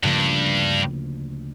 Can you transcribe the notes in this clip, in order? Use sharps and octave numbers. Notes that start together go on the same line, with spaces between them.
D2 G2 C#3 F3 A#3